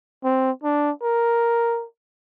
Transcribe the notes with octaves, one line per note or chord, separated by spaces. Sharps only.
C4
D4
A#4